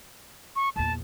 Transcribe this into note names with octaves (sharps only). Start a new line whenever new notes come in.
C#6
A#1 E2 A5